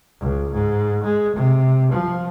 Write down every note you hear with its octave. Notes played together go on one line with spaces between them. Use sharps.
C#2
G#2
G#3
C3
F3